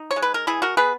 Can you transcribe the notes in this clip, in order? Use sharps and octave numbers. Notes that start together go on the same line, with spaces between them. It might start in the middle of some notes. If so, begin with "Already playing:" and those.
Already playing: D#4
C#5
G#3
B4
A#4
E3 E4 G#4
F#4 A#4
B3 G#4 B4